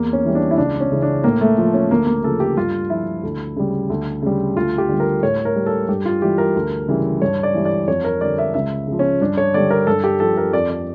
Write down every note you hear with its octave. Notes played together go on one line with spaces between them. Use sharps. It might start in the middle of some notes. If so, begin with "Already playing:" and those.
Already playing: E2 A#3
C#4
E3 G3
D4
E4
C#2 D4
C#4
C#3 E3
D4
A2 A#3
A3
F3
C#4
D2 A#3
A#3
C#3 F3 A4
G4
G2 F4
F3 E4
D2
C#3 G3
D2
C#3 G3
D2 F4
G4
D3 G3
A#4
A2 C#5
A#4
G3
A4
G2 G4
F4
E3 G3 G4
A#4
D2
C#3 E3 G3
G2 C#5
D5
E3 G3
D5
F2 C#5
A#4
D3 G3 D5
E5
C#2 E5
C#3 F3
C#4
G2 D4
C#5
D3 G3 D5
A#4
G2 A4
G4
F3 A4
A#4
F2 D5
D5